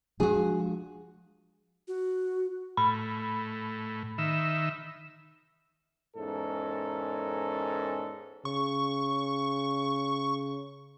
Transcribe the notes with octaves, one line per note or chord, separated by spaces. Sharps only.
F3 G#3 D4 F#4 G#4
F#4
A2 B5
D#3 E5
E2 G#2 C#4 A4 A#4
C#3 C#6